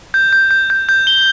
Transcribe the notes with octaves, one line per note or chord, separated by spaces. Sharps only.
G6
G6
G6
G6
G6
G7